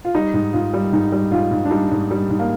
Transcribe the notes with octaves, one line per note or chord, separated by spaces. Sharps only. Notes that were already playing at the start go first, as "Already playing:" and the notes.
F4
G3 D#4
G#2
G#2 F4
G3
G#2 D#4
G3
G#2 F4
G#2
D4
G3 D#4
G#2
G3
G#2
A#3